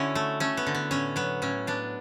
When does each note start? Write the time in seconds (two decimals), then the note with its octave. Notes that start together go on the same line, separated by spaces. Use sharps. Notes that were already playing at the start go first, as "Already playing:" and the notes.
Already playing: D3 C#4 E4 F#4
0.15 A3
0.40 A3 C#4
0.57 B3
0.67 D3
0.75 B3
0.91 A2 C#4
1.16 F#3 B3
1.42 A2 C#4
1.67 B3 D4